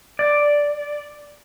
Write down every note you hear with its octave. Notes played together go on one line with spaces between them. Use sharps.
D5